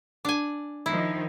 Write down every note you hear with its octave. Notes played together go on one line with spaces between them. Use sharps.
D4 G#5
D#3 F3 D#4 E4